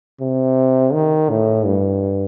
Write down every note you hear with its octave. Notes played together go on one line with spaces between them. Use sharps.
C3
D#3
A2
G2